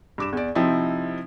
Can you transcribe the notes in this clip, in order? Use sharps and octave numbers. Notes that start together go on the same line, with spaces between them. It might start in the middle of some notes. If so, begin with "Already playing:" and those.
G2 D6 E7
E2 D5
C3 F3 C4 D#4 E4